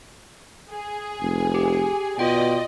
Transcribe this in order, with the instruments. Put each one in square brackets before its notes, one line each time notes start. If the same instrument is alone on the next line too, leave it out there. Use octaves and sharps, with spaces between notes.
[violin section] G#4
[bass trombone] F1
[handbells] G4
[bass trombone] B2 [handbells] F4 G5 [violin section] D5 D#5